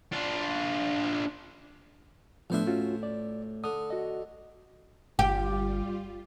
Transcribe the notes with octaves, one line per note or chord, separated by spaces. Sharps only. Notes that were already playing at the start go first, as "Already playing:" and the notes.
D4 F4
A2 F3 B3 D4 C5 E5
C#4 F4 F#4
D5
D3 D#6
F#4 D#5
G1 G3 F4 G4